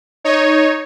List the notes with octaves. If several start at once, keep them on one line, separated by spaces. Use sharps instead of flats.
D#4 C#5